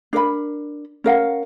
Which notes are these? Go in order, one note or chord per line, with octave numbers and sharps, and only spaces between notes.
D4 A#4 D#5 B5
C#4 A#4 F5 F#5